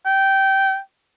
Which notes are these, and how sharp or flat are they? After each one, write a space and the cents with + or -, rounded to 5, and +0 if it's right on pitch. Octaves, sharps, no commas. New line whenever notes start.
G5 -15